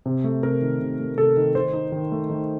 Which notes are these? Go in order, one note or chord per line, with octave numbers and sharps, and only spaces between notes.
C3
A3
C3 A#4
D#3
C3
A3
C3 A4
D#3
D#3 C5
D#4
D#3
A3
D#3